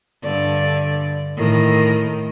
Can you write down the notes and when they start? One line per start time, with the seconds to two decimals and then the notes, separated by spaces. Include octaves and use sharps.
0.24 G2 D3 D5
1.36 A2 D#3